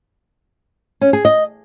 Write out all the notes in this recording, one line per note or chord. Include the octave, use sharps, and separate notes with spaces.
C#4
G#4
D#5